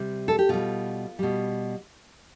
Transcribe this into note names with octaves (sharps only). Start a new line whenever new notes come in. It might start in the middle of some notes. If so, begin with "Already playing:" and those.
Already playing: C3 G3
A4
G4
B2 G3 F4
B2 G3